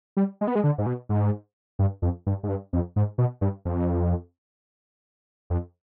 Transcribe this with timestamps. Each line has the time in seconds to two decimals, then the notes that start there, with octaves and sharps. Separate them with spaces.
0.17 G3
0.41 G#3
0.47 B3
0.55 G#3
0.64 D3
0.78 G#2
0.86 B2
1.09 G#2
1.79 G2
2.02 F2
2.27 G2
2.43 G#2
2.49 G2
2.73 F2
2.96 G#2
3.18 B2
3.41 G2
3.65 F2
5.50 F2